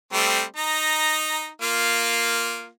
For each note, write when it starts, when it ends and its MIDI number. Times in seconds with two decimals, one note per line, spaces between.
0.13 0.42 55
0.13 0.42 57
0.13 0.42 60
0.56 1.48 63
0.56 1.48 82
1.62 2.68 58
1.62 2.68 65